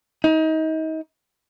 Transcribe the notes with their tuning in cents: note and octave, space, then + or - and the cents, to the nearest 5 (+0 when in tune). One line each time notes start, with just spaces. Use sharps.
D#4 +30